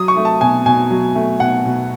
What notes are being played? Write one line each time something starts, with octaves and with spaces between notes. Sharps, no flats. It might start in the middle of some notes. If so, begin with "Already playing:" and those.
Already playing: F#3 D#6
C#6
A3
A5
B2 G#5
B2 G#5
F#3
A3
B2 F#5
B2